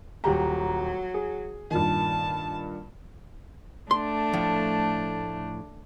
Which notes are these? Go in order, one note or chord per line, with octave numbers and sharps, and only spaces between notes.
D#1 F#3 G4 A#5
G#4
G2 A#2 D#3 A5
A3 D4 C6
A2 F3